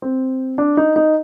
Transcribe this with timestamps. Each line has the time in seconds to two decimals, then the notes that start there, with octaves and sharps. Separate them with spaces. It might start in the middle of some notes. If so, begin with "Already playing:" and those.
0.02 C4
0.58 D4
0.77 D#4
0.96 D#4